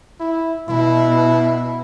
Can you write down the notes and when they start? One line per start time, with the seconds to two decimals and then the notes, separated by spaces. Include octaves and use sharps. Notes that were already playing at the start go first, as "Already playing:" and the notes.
0.20 E4
0.69 B2 E4